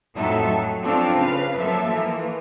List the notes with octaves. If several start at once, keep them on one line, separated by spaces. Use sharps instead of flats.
F2 A2 F#3 D#4 A4 E5
F#3
F3 C4 D4 F4 A4 C#5
C#3 B4 F5
F3 F#3 A#3 A4 E5
E3 F3 A#3